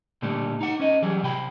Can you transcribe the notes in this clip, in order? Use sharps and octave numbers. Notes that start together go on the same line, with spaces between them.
A#2 D3 G3 A3
D#4 F#5
C#4 C5 D#5
E3 F#3 G3 G#4
C3 G5 B5